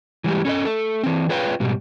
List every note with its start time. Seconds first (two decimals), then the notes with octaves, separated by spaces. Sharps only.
0.24 E3 G3 G#3 G4
0.45 C#4 A4 C5 D#5
0.65 A3 A4
1.03 E3 C4
1.29 F4 G#4 B4 C#5 F5 G5
1.60 G#2 B2 G3